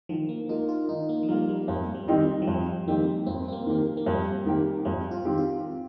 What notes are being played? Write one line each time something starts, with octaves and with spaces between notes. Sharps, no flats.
D#3 F3
A#3
A#3 D#4 F4 A#4
F4
D#3 D#4
A#3
F3
G3 A#3 F4 A#4
G3
F2 A#3
G3
D#3 C4 D#4 G4
G3
F3
F2 G3
D#3 A#3 C4 D#4 G4
F2 C4
C4
A#3
D#3 A#3 G4 A#4
A#3
F2 G3
D#3 A#3 G4 A#4
F2 G3
F4
D#3 C4 G4
F4